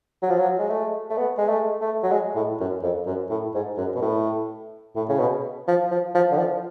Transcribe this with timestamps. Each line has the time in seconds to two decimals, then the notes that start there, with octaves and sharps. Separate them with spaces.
0.22 F#3
0.30 F3
0.38 F#3
0.59 G#3
0.70 A3
1.10 A3
1.17 B3
1.38 G#3
1.49 A3
1.81 A3
2.03 F#3
2.12 G#3
2.35 A2
2.60 F#2
2.83 F2
3.06 F#2
3.30 A2
3.54 G#2
3.77 F#2
3.95 B2
4.01 A2
4.96 A2
5.09 C#3
5.19 B2
5.68 F3
5.91 F3
6.14 F3
6.31 D3
6.38 F3